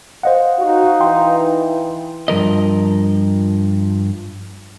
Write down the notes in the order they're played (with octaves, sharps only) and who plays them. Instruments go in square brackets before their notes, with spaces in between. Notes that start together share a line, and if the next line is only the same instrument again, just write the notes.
[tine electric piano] C5 D#5 F#5 [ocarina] F5
[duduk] D#4 [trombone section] F#4
[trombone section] E3 [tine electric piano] G5 C6
[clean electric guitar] G2 F3 A#4 D#5